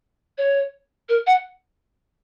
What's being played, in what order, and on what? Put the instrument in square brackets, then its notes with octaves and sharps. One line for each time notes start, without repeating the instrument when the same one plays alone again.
[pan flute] C#5
A#4
F#5